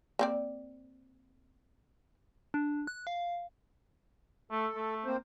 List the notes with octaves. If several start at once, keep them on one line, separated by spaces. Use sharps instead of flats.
A#3 C4 D5
D4
F#6
F5
A3 A4
A3
A#3 C4 C5